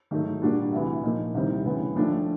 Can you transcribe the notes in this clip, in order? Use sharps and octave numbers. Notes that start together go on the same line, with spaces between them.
G#2 D#3 F#3 A3
A#2 G3 A#3 D4 F#4
D2 C3 E3
A#2 F3 A#3 D#4
C2 C3 D#3 G3 C4
D2 C#3 E3 G3 B3
D#2 D3 F3 A3 D4